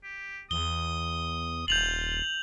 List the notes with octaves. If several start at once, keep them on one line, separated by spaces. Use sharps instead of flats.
G4
E2 D#6 G7
D#1 F4 G6 F7 F#7